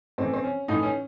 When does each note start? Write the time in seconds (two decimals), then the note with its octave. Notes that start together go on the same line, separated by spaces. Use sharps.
0.18 A2 E3 C4
0.33 C4
0.44 C#4
0.68 A2 E3 D#4
0.83 C#4